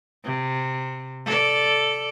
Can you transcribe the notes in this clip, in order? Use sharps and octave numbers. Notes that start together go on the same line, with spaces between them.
C3
A4 D5